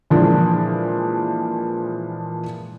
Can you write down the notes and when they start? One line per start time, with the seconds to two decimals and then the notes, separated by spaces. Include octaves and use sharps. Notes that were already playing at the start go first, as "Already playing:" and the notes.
0.10 A#2 E3 F3 G#3 D4 G#4